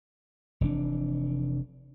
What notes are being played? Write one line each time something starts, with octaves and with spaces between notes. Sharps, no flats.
F1 E3 D4